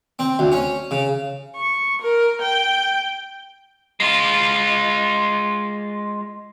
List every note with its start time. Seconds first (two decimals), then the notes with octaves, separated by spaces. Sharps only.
0.19 C4
0.39 D2
0.52 C#4
0.91 C#3
1.57 C#6
2.02 A#4
2.41 G5
4.00 G#3 F4